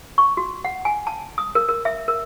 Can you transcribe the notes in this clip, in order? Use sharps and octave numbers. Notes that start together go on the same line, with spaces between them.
C#6
F#4
F#5
G#5
A5
D#6
A#4
A#4
E5
A#4